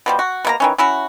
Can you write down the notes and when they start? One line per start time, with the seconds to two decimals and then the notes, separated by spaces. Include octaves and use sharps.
0.06 B2 F3 G3
0.19 F#4
0.45 B2 A#3 A#5
0.60 D#3 E3 C#4
0.78 C#4 E4 F#4